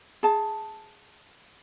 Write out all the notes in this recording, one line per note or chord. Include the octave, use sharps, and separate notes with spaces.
G#4 A5